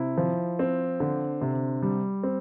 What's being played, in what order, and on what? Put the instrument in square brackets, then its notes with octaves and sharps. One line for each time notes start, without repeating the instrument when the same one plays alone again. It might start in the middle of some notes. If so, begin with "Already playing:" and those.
Already playing: [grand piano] C3 E4
F3
C4
D3
C3
G3
C4